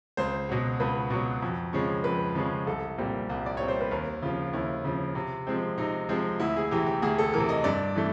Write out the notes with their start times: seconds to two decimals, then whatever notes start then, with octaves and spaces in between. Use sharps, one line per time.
0.17 C#2 C5
0.49 B2 F#3
0.80 C#2 B4
1.10 B2 F#3
1.42 F2
1.73 C#3 F3 G#3 C#4
2.04 F2 B4
2.35 C#3 F3 G#3 C#4
2.67 C2 A4
2.98 A#2 G3 C4
3.29 C2
3.46 D5
3.57 A#2 G3 C4 C#5
3.68 C5
3.81 B4
3.91 D#2 A#4
4.22 C#3 F3 F4
4.53 D#2 E4
4.84 C#3 F3
5.15 C3
5.47 F3 G#3 C4
5.78 C3 D#4
6.09 F3 G#3 C4
6.40 D2 E4
6.56 G#4
6.71 C3 E3 G4
6.86 G4
7.02 D2 G#4
7.18 A4
7.33 C3 E3 A#4
7.49 D#5
7.64 G2 D5
7.96 E3 A3